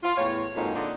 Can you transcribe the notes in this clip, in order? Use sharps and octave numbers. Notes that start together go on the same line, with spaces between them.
F4
E2 A2 C#5
F2 G#2 B2 A#3 D#4
A#2 D3 D4 D#4